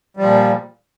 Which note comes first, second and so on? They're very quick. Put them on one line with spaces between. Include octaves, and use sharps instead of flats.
G3 F3 A#2